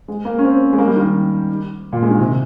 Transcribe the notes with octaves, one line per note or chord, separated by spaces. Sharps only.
G#3
A#3
C#4
C4
G#3
A#3
G3
D#3
A#2
G#3
D#3
C3